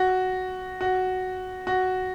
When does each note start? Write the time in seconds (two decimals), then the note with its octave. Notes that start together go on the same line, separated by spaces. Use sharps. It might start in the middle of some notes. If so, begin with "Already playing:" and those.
Already playing: F#4
0.81 F#4
1.67 F#4